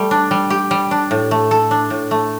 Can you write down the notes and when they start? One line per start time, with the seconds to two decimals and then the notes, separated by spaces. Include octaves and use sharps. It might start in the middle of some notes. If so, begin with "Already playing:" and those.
Already playing: G3 A3
0.11 D4
0.31 G3
0.50 G4
0.71 G3
0.91 D4
1.11 A2
1.31 A3
1.51 A4
1.71 D4
1.90 A2
2.11 A3